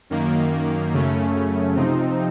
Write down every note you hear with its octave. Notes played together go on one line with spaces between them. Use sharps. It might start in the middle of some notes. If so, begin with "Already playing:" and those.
F#2 D#3 A#3
F#2 C#3 A3 C#4
C3 F3 C4 D#4